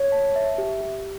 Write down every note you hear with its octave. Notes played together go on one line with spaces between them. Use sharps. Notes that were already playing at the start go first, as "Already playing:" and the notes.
Already playing: C#5
A5
E5
G4
G4